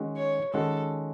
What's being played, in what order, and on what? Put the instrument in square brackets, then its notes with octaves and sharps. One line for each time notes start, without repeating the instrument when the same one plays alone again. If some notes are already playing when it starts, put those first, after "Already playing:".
Already playing: [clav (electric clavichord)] D#3 G#3 C#4 F#4
[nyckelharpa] C#5
[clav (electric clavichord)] D#3 G#3 C#4 F#4 [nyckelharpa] A4